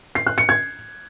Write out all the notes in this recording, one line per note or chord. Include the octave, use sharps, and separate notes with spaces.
C7
F#6
C#7
G#6